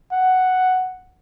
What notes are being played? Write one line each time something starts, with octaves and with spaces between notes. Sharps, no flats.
F#5